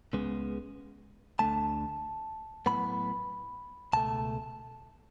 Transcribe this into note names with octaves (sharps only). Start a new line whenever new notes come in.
C#2 C#3 G#3 B3
D2 D3 A3 A5
A2 F#3 B3 B5
C#2 B2 A3 A5